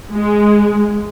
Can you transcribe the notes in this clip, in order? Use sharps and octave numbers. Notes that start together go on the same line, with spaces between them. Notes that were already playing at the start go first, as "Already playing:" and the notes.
G#3